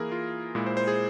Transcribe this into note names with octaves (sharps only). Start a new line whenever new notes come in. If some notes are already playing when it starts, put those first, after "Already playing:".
Already playing: E3 A#3 E4 G#4 A#4
F4
A#2 G#3 E4
C5
C5
G#4